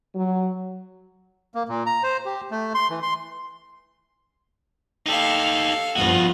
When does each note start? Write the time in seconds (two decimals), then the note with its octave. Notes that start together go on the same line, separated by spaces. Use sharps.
0.16 F#3
1.55 A#3
1.69 A#2
1.86 A#5
2.03 C5
2.26 G4
2.51 A3
2.74 C6
2.90 E3
3.02 C6
5.06 D#4 G4 A4 F5
5.96 G2 F3 B3 F4 F#4 D#5